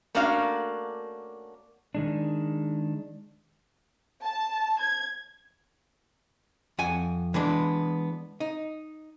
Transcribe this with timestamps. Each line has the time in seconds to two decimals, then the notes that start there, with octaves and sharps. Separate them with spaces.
0.15 A3 A#3 C#4 D4 F#4 F5
1.95 D#3 G#3 D4
4.25 A5
4.81 G#6
6.78 F2 F#5 G#5
7.34 E3 G#3 B3 D4
8.40 D#4